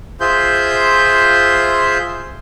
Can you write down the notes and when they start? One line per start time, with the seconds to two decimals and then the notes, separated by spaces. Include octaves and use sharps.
0.21 F4 G#4 C5 E5 C6 G6